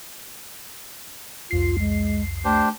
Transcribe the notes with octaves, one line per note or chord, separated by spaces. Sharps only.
C2 F2 F4 C7
G#3
A3 D4 G4 C5